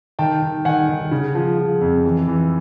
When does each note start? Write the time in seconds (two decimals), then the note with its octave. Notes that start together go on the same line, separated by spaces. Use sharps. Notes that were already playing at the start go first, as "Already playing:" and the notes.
0.19 D#3 G5 A5
0.42 D#3
0.65 D#3 F#5 G#5
0.89 D#3
1.11 C#3
1.35 F3
1.58 F3
1.81 F2
2.05 E3
2.28 E3